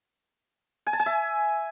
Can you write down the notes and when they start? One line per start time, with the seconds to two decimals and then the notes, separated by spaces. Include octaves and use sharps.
0.87 G#5
0.93 A5
1.00 G#5
1.06 E5